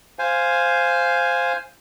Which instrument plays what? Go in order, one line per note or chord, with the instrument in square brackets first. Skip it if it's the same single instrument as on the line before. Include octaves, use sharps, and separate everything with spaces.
[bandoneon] C5 F5 G#5